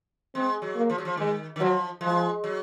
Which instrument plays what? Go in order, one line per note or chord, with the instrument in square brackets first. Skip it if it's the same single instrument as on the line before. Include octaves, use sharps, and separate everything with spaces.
[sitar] G#3 [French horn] C4
[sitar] F#3
[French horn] A#3
[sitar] F3
F#3
F3
[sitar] D#3 [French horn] G#3
[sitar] D#3
[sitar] F3 [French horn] F#3
[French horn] F3 [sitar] G#3
[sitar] F#3